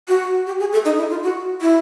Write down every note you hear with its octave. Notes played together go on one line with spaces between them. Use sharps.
F#4
G4
G#4
A4
D#4
E4
F4
F#4
E4